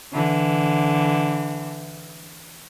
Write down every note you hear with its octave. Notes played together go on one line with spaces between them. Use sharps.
D3 E3